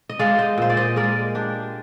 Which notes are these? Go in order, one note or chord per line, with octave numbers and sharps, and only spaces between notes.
D#5
G#3 D5 F5
C5 D#5
A#2 C5
D5
C5 D#5
G#3 A#4 D5
D4 G4